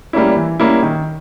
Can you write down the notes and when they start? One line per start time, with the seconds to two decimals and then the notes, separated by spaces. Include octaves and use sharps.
0.13 G3 A#3 C#4 E4
0.36 E3
0.60 G3 A#3 C#4 E4
0.83 D#3